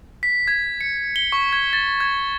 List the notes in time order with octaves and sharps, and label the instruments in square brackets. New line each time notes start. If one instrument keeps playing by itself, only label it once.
[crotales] B6
G#6
C#7
G7
C#6
G#6
A6
G#6